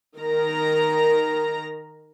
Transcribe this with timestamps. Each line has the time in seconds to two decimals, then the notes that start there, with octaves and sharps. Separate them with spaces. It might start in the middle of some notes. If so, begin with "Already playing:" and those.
0.17 D#3 A#4 A#5